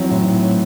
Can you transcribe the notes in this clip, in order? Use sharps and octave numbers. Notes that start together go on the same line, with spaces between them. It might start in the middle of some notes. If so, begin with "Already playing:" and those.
Already playing: E3 F#3 C4
A2